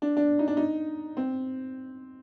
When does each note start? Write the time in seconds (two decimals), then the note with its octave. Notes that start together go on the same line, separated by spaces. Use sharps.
0.02 D4
0.17 D4
0.39 D#4
0.48 D4
0.57 D#4
1.17 C4